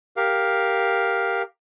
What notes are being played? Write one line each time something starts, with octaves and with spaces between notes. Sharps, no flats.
G4 A#4 F5